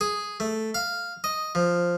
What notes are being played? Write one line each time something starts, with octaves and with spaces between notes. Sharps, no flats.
G#4
A3
F5
D#5
F3